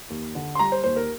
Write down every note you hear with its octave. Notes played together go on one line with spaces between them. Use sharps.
D#2
D3
C6
G3 A#5
C5
D#2 C5
A#4